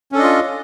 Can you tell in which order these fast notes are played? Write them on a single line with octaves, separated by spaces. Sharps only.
C#4 A4 D4 D#5 F4